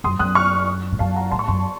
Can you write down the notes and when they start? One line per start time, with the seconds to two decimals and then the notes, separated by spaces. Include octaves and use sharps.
0.04 F#2 C6 D#6
0.19 F#2 D#6 F#6
0.35 C#6 F6
0.92 A2
0.99 F#2 F5 A5
1.15 F#5 A#5
1.31 A2 A5 C6
1.39 C#6
1.48 F#2 A5 C6